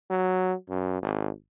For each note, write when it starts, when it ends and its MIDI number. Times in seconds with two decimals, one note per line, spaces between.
0.10 0.53 54
0.69 0.97 42
1.03 1.30 32